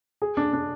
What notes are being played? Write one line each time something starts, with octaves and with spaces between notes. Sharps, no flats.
G#4
D4
D4